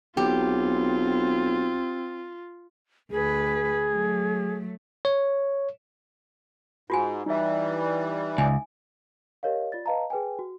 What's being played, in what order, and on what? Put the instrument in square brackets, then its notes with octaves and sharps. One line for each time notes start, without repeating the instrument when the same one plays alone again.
[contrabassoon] B1 [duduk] C4 [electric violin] F4 [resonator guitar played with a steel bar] G4
[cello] D2 B4 [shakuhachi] G#4
[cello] F#3 A3
[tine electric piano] C#5
[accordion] G#2 [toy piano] F4 F#4 G#5
[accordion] E3 G3 [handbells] D#4 E5
[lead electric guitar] C#2 [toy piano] G#5
[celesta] G4 A#4 C#5 D#5 F5
F4 D5 A6
B4 D#5 F5 A5 A#5
G#4 B4 G5 G#5
F#4